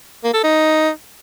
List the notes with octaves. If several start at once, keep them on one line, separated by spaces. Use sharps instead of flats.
A#3
A4
D#4